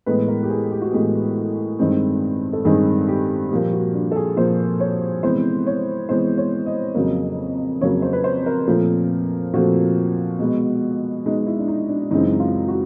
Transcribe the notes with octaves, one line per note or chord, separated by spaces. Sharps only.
A2 E3 G#3 B3 B4
A#4
G4
G#4
G4
F#4
A2 E3 G#3 B3 G4
G2 D#3 G#3 C4
A4
G2 D#3 G#3 C4 G#4
G4
A#2 F3 A#3 G4
F#4
D4
A4
G#4
A#2 F3 A#3 C5
C#5
C3 E3 G#3 B3 C5
C#5
C3 E3 G#3 B3 C5
C#5
D#5
F2 C#3 F#3 A#3
F2 C#3 F#3 A#3 C#5
C5
B4
C5
A#4
A#2 F3 A3 C4
A#2 F3 A3 C4 F#4
B2 G#3 B3
B2 G#3 B3 D#4
E4
D4
D#4
D4
F#2 C#3 E3 G#3 C4 D#4
F4
F#4